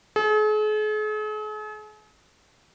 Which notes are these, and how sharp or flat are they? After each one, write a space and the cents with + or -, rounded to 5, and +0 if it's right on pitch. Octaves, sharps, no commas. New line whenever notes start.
G#4 +45